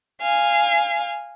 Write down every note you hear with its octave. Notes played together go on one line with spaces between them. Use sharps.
F5 G#5